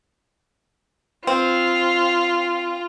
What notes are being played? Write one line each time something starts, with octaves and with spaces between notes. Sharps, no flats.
C4 F4